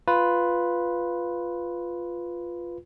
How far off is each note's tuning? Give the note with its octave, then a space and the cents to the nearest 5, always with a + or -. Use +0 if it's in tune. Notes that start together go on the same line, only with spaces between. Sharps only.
F4 +0 B4 +0